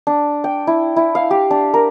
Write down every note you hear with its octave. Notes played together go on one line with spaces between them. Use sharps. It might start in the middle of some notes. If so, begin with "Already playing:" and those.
D4
G5
E4
E4
F5
G4
D4
A#4